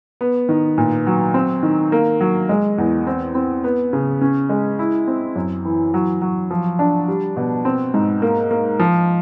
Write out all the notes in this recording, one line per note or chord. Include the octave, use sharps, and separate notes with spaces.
B3
D#3
A#2
F#3
C4
D#3
A#3
F#3
G#3
E2
C4
C4
B3
C#3
C#4
G#3
E4
C4
F#2
E3
F#3
F#3
F3
D4
G3
B2
C4
G#2
A#3
A#3
F3